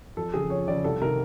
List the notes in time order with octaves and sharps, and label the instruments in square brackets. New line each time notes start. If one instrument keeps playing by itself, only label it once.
[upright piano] F2 A4
C#3 F3 G#4
F2 C#5
C#3 F3 D5
C2 A4
C3 D#3 A#4